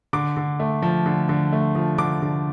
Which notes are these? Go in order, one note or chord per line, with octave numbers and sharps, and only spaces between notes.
D3 D6
D3
A3
F3
D3
D3
A3
F3
D3 D6
D3